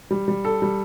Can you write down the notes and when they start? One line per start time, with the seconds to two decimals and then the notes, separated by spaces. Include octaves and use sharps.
0.11 G3
0.28 G3
0.45 A4
0.62 G3